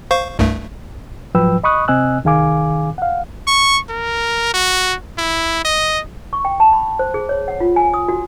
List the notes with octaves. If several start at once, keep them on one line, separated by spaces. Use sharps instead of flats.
C5 F5 C#6
C2 G2 A3
G#2 F3 F#3 B4 G5 E6
D#5 B5 C#6 D#6 F#6
C3 C4 D#5 G#5 E6 F#6
C2 D#3 G#4 F5 G#5 D6
F5 F#5
C#6
A#4
F#4
E4
D#5
C#6
G5
A5
B5
C5
G#4
C#5
F#5
F4
G#5
D#6
F#4